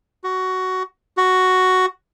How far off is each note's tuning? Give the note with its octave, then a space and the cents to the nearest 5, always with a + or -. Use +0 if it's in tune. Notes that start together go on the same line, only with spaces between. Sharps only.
F#4 +10
F#4 +5